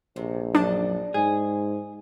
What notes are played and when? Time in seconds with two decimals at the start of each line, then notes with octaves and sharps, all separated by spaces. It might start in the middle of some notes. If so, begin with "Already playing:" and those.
0.16 A#1 C3
0.55 F#2 D4 D5 D#5 A5
1.14 G#2 G#4